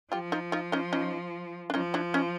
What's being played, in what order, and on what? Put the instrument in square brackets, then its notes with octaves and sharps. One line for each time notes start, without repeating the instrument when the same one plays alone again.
[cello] F3 [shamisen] F4 G4
[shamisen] D#4 F4
D#4 F4
C#4 D#4
C#4 D#4
D4
[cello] F3 [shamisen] C#4 D#4
[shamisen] D4 E4
C#4 D#4